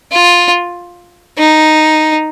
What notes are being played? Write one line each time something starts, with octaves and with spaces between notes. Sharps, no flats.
F4
D#4